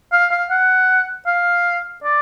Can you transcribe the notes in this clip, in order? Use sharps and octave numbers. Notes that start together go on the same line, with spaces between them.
F5
F5
F#5
F5
D5